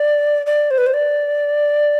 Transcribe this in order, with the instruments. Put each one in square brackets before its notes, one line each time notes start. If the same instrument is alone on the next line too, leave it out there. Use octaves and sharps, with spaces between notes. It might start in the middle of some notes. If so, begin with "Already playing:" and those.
Already playing: [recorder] D5
D5
C5
B4
C5
D5